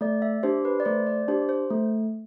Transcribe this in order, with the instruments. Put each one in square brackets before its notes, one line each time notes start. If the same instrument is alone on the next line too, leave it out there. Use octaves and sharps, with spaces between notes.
[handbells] A3 D5
E5
D4 G4 C5
B4
D5
A3 C5
D5
D4 G4 C5
C5
A3